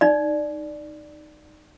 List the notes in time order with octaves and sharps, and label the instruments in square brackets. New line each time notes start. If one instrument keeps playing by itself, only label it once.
[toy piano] D#4 D5